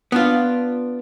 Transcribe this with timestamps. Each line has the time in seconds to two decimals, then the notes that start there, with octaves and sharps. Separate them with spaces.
0.12 B3 D4 F4